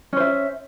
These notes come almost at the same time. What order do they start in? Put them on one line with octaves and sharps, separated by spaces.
C#4 C5 E5